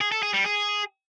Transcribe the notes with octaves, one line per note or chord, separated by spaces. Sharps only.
G#4
A4
G#4
G3
G#4